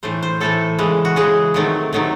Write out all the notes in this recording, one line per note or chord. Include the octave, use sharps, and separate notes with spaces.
A2 E3 A3 C5
C5
A2 E3 A3 A4
C#3 E3 G#3
F#4
C#3 E3 G#3 G#4
C3 D#3 F#3 A3
C3 D#3 F#3 A3